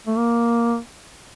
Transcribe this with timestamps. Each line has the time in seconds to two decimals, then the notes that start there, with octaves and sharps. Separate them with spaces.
0.07 A3
0.17 A#3